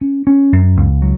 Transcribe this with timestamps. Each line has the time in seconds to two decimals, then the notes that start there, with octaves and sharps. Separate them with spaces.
0.01 C#4
0.27 C#4
0.52 F#2
0.77 C#2
1.02 F#3